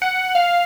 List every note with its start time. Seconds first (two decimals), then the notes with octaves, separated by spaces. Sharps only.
0.02 F#5
0.35 F5